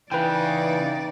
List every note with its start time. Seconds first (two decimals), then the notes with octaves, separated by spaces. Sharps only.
0.12 C#3 E3 D#4 B4 D5 G5